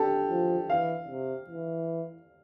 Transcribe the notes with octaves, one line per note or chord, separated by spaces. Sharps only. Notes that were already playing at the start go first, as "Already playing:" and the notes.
Already playing: D4 G4 A4
F3
E3 F5
C3
E3